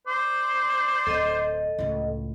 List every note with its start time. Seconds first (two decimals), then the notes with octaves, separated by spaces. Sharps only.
0.07 C5 D5
1.07 D1 A4 D#5
1.79 C#2 A2